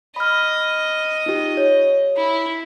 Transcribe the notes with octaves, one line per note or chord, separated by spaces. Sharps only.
D#5 B5 F6
D#4 F4 G4
C#5
E4